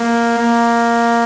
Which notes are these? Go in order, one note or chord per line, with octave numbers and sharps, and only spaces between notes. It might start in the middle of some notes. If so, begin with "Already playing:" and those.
Already playing: A#3
A#3